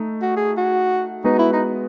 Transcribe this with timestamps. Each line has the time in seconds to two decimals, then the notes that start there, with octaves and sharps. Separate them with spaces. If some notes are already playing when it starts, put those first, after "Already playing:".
Already playing: A3 D#4
0.22 F#4
0.36 G#4
0.57 F#4
1.24 G#3 B3 D#4 F#4 B4
1.39 E4
1.53 D#4